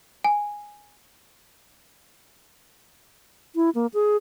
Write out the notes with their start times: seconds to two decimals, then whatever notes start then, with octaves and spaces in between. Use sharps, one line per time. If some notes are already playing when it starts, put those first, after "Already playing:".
0.24 G#5
3.56 E4
3.75 A#3
3.94 G#4